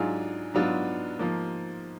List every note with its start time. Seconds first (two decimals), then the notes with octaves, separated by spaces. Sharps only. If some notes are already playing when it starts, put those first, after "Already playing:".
Already playing: G#2 F#3 D4 F4 G#4
0.54 G#2 F#3 B3 D4 F4
1.19 G#2 F3 A#3